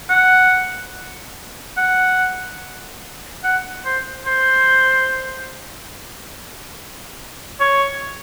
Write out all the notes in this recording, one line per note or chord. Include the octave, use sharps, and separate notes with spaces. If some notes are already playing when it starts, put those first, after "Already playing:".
F#5
F#5
F#5
C5
C5
C#5